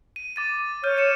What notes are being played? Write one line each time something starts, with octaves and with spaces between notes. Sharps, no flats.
D#7
D6 A6 D#7
C#5 F6 G6 D#7
C#7 D#7 E7